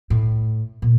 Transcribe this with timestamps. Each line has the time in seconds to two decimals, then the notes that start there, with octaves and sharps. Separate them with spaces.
0.10 A2
0.82 A#2